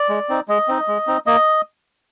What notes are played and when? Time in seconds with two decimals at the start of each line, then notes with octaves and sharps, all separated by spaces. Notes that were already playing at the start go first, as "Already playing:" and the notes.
Already playing: D5
0.09 G#3
0.29 C4 D#4
0.48 G#3 D#5
0.68 C4 D#4
0.88 G#3
1.07 C4 D#4
1.26 A#3 D#5